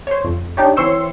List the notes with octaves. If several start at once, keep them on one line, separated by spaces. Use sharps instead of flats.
C5 C#5
F2
D4 D#4 G4 C#5
E3 C4 C#5 C6 E6 C#7